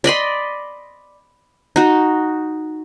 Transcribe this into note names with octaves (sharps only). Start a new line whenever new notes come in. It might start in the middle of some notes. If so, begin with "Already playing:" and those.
D5 D#5 B5 C6
D#4 F#4